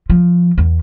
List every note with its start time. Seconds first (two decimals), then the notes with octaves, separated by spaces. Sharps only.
0.10 F3
0.58 E2